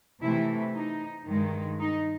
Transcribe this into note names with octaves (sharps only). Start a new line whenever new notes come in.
C3 E3 A3 E4
D#4
G2 D#3 G#3
D#4